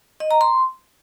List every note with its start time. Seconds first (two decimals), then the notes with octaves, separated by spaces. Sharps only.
0.20 D#5
0.31 A#5
0.41 C6